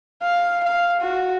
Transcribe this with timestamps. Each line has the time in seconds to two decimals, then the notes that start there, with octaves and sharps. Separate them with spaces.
0.22 F5
0.63 F5
1.01 F#4